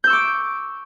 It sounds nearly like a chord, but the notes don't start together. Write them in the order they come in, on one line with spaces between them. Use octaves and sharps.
G6 E6 C#6 D6